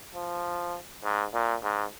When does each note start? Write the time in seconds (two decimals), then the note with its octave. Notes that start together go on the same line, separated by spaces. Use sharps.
0.15 F3
1.04 G#2
1.34 A#2
1.64 G#2